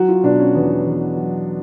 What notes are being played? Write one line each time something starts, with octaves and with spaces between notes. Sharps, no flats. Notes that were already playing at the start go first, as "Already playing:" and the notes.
Already playing: F#3 F#4
F4
B2 D4
C#4
E2 B3
E2
F#3